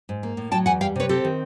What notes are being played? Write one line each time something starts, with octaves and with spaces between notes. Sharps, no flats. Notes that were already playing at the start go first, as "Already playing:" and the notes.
G#2
A#3
A2
F#3 G5 A5
E2 F#5 G#5
G3 F5 G5
C3 B4 C#5
C4 G4 A4
D#3